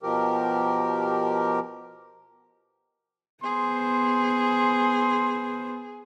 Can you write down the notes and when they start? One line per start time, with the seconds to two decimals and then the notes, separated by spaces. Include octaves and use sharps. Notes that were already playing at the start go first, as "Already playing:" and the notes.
0.03 B2 F3 G4 A#4
3.44 B3 G#4 C5 C6